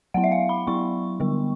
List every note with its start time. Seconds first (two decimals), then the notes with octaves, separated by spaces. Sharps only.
0.14 F#3 B3 E4 F#5
0.24 E5
0.32 F5
0.49 B5
0.67 F#3 B3 E4 C#6
1.20 D3 G3 B3